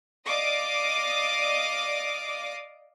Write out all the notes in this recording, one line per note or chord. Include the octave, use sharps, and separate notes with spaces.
D5 D#5 F5 D6 D#6